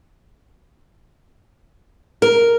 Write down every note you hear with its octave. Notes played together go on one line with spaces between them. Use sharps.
A#4